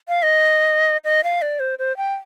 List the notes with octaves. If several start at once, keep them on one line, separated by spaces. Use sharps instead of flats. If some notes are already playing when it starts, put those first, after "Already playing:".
F5
D#5
D#5
F5
D5
C5
C5
G5